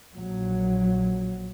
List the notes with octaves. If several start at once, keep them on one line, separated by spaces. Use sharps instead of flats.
A#1 A#2 F#3